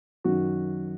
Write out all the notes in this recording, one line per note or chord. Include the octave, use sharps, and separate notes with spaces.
F#2 D#3 F#4